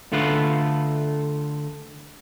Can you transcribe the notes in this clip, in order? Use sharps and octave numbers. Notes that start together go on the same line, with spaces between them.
D3 A3 F4 B4